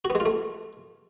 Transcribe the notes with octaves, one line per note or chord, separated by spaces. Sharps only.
F#4
B3
G#3
F4
A3